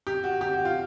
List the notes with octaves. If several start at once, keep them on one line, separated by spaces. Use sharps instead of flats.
G4
F#4
G4
F#4
F4